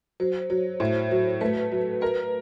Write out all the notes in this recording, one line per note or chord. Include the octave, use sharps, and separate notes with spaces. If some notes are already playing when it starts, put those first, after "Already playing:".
F#3 C5
F#3 C#5
A2 C5
F#3
A3 B4
F#3
A#4 B4